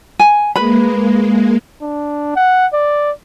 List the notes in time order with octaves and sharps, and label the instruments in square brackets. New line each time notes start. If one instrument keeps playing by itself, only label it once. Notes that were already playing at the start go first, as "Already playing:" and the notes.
[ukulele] G#5
[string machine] G#3 A#3 [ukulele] B4 B5
[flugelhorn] D4
F#5
D5